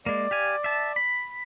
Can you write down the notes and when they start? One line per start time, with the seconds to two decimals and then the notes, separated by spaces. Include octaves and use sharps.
0.06 G#3 A#3 D5
0.31 G4 F5 G#5
0.64 E5 A5
0.96 B5